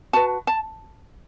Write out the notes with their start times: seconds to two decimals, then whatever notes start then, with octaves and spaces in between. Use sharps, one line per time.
0.13 F#4 B4 A5
0.47 A5